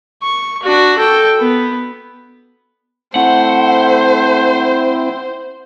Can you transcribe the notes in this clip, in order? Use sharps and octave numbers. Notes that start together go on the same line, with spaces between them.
C#6
D4 F#4
A4 G5
B3
A3 C4 E4 C5 F#5